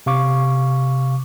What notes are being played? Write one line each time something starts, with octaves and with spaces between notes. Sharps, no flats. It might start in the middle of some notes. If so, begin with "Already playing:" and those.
C3 F5 C#6 D6